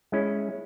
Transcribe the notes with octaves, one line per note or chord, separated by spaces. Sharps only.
G#3 C#4 E4